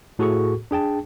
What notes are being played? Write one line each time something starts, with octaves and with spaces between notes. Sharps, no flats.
A2 F#4 G#4 A4 C#6
D4 G#4 G5 A5